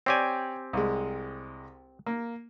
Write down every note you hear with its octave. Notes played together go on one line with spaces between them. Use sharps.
C4 G4 C#5 D5 G#5
C2 G#3
A#3